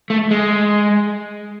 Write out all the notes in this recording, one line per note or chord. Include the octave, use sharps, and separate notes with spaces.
A3
G#3